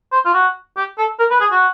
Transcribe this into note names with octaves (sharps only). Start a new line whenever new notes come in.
C5
F4
F#4
G4
A4
A#4
B4
G#4
F#4